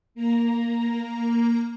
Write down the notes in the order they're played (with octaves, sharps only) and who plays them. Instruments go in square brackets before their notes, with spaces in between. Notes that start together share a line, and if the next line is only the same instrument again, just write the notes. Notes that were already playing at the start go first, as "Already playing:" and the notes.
[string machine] A#3 A#5